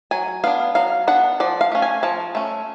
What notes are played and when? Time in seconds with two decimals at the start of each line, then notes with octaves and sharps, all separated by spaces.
0.11 F#3 G#5
0.44 B3 D4 F5
0.75 F#3 F5
1.08 B3 D4 F#5
1.40 F3 D5
1.61 F5
1.72 A3 C#4
1.82 G#5
2.03 F3 A5
2.35 A3 C#4